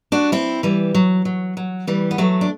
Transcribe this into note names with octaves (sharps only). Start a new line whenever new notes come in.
D4 F#4
C4 E4
E3 G3
F#3
F#3
F#3
E3 G3
B3
F#3 A3
D4